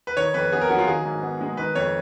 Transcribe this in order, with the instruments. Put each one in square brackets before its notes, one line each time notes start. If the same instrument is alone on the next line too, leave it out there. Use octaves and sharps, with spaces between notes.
[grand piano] B4
[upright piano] D#3 [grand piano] C#5
[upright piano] F2 [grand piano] B4
[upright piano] B3 [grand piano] G#4
[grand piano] A#4
[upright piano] F#3 [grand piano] F#4
[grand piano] F4
[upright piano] D#3 [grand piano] G#4
[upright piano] G#2
B3
G#3
[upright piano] D#3 [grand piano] B4
[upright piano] F2 [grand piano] C#5